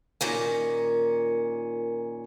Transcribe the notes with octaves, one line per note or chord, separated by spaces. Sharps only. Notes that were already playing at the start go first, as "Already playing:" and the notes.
A#2 D#3 C#4